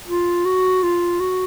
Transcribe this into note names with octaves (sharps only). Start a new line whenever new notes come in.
F4
F#4
F4
F#4